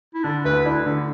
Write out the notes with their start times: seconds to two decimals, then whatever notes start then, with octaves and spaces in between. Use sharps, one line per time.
0.15 E4
0.24 D3 D4
0.45 D2 B4
0.65 D4 E4
0.86 D3